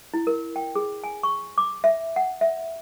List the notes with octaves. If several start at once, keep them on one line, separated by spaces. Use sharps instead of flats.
E4
A#4
G5
G#4
G#5
C#6
D6
E5
F#5
E5